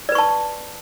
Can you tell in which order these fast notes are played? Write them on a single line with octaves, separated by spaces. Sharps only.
D5 B4 C#6 A5